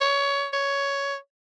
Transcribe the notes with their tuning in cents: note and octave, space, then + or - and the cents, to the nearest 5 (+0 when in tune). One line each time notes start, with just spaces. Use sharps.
C#5 +20
C#5 +10